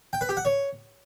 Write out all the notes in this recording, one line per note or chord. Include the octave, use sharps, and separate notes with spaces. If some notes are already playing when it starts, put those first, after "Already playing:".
G5
B4
G4
F#5
C#5